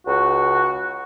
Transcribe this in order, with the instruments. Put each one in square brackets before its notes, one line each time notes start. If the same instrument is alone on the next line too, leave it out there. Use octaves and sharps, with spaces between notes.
[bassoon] C#2 [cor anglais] F#4